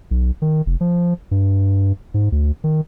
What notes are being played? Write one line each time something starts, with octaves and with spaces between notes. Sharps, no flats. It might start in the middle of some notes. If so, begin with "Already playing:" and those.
B1
D#3
F1
F3
G2
G#2
D2
D#3